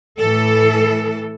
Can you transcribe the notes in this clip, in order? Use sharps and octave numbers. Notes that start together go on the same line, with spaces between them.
A2 E3 A4